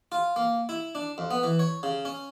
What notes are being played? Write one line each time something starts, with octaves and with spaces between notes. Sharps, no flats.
F4
A#3
E4
D4
F2
B3
E3
C#5
C#3
C#4